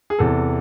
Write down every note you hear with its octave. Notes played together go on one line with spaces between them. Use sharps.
G#4
E2 C3 E3 A4